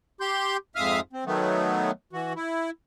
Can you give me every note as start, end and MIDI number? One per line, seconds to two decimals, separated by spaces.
0.21 0.57 67
0.21 0.57 84
0.21 0.57 91
0.76 1.00 41
0.76 1.00 44
0.76 1.00 76
0.76 1.00 77
0.76 1.00 87
0.76 1.00 89
1.13 1.24 60
1.26 1.91 51
1.26 1.91 54
1.26 1.91 57
1.26 1.91 59
2.13 2.33 52
2.13 2.33 66
2.36 2.70 64